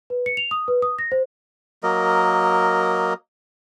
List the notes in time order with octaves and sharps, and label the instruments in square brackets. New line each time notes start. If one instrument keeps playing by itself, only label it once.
[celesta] B4
C#7
F7
D#6
B4
D#6
A#6
C5
[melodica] F#3 A#3 A#4 D#5